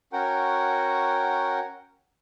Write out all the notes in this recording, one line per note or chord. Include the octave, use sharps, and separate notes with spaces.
C#4 F#4 A#4 F#5 G5